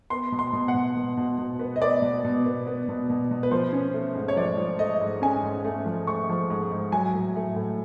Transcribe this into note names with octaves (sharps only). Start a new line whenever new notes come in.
B3 C6
B2
C6
B2
F#5
B2
B2
B2
B2
B3
D#5
B3 D5
B2
B2
B3
B3
B2
B2
B2
B4
F3 C5
C#4
A3
G#2
C#5
F3 D5
F3
A3 D#5
G#2
C#4 G#5
G#2
A3
F3
A3 C#6
F3
G#2
G#2
F#3 G#5
A2
A3
A2